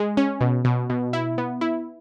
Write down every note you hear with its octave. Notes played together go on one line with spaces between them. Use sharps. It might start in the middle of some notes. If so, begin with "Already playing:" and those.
Already playing: G#3
C#4
B2
B2
B2
E4
B3
E4